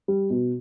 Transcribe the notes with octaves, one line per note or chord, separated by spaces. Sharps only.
G3
B2